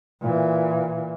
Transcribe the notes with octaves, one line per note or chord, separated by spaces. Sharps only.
A#2 E3